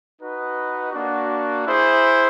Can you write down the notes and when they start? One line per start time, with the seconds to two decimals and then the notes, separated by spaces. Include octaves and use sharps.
0.18 D#4 F#4 B4 D#5
0.92 A#3 D4 F#4
1.65 E4 G#4 C5